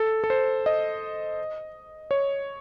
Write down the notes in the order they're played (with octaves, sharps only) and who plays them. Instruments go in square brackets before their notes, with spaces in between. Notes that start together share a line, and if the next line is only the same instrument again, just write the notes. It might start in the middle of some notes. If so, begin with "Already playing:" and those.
Already playing: [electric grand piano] A4
A4
C5
D#5
C#5